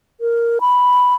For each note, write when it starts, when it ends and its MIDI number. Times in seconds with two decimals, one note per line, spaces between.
0.21 0.59 70
0.61 1.14 83